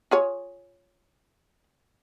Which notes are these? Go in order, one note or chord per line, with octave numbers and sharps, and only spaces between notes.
F4 G#4 C#5